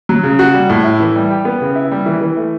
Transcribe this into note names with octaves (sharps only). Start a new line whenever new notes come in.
F#3
C#3
F#4
G3
A2
E4
E3
G3
G4
B3
C#3
E4
G3
E3
E3
A3